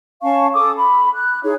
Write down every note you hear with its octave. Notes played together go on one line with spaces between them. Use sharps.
C#4 F5 A5 C#6
A4 D6 D#6
B5
F#6
D#4 E4 G#4 C#5